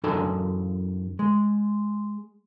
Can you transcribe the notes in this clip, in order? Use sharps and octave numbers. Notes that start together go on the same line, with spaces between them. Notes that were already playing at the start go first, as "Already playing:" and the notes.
F#2 E3 D#4 G#4 A4 A5
G#3